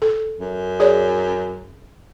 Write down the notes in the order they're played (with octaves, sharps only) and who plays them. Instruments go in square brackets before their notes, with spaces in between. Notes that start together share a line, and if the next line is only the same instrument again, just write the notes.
[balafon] A4
[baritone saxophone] F#2
[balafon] G#4 C#5 D5